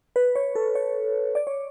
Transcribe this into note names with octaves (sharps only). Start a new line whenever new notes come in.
B4
C#5
A4
C#5
D5
C#5